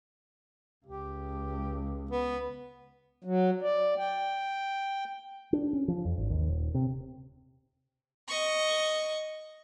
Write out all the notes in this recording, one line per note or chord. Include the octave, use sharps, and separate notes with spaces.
C#2 G4
B3
F#3
D5
G5
D4
C#4
F3
F2
G#1
D#2
D#1
C3
D#5 C#6